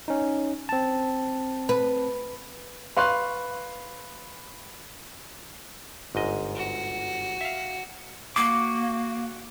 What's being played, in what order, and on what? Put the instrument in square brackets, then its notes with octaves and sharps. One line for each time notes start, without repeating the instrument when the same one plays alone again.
[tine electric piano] C#4 D#4
C4 A5
[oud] B4
[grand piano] B4 F5 C6 C#6 F#6
[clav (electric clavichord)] G1 G#2 D#5
[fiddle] F#4
[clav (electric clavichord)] E5 F5
[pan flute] A#3 [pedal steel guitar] F#4 D6